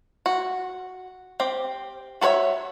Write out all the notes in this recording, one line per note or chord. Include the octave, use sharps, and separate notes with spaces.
F#4
C4 G4
F#4 A4 B4 C#5 E5